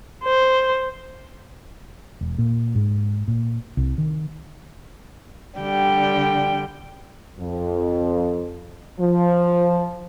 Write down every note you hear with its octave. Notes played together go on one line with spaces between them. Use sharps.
C5
E1
A#2
G#2
A#2
C2
D#3
D3 G3 G5
F2
F3